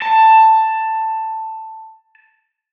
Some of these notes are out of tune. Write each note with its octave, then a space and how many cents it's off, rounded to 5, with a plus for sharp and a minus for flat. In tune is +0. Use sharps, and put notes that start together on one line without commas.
A5 +10